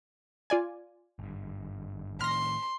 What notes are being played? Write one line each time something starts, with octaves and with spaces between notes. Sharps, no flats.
F4 D5 G#5
G#1 G2
A2 D#3 C6 F6 A#6